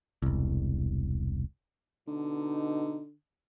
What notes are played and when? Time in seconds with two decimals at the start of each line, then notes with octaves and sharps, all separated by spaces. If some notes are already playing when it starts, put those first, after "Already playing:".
0.22 E1 C2
2.08 B2 D3 D#4